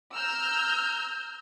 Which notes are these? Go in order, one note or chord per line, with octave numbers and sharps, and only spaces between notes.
A#5 E6 F6 G6